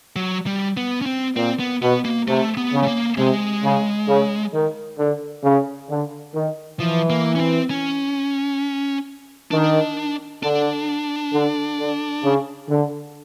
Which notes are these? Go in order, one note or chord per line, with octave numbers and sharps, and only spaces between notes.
F#3
G3
B3
C#4
C4
A#2 C4
B3
B2 B3
A#3
C3 A3
B3
C#3
A3
A#3
C3 G#3
C#3
C#3
D#3
D3
C#3
D3
D#3
E3 F3
A#3
C#4
C4
C#4
D#3 D4
D3 D4
D3
D3
C#3
D3